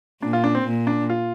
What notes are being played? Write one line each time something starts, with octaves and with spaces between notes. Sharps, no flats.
A#2 D4
F4
D4
C4
A#2
D4
F4